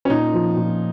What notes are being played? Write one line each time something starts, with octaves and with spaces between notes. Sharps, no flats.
C#4
A#2 D#4
F3
A#2